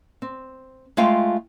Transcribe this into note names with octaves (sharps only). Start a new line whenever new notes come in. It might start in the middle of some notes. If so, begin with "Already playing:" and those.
C4
G#3 A3 F4 F5 G5